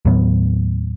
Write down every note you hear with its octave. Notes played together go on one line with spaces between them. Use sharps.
D#2 A2 F#3 B3